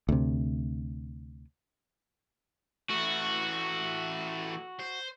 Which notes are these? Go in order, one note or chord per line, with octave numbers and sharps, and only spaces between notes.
D2 C3
E3 A3 F#4
C5